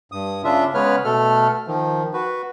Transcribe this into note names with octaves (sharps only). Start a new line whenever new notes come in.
G2 D#6
C#3 D4 F4 E5
C#3 G#3 B3 B4 C#5 F6
B2 A3 A4 F6
D#3 F3
F#4 B4